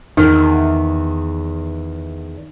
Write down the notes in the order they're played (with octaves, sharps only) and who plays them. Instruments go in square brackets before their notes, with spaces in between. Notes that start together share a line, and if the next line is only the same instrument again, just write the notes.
[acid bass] E2 [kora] D#3